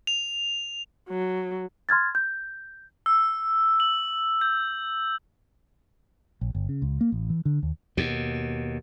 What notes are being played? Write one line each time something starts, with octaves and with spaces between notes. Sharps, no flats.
F7
F#3
C6 F6 G#6 A6
G6
E6
F#7
G6
A#1
G1
C#3
C#2
A#3
A1
E3
D3
D#2
D#2 B2